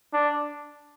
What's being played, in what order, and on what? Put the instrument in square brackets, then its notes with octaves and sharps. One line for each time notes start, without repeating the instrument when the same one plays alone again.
[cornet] D4